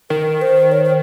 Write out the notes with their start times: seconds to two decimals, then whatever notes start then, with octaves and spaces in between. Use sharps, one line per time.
0.10 D#3 A#4
0.42 C5
0.72 C#5
0.84 C5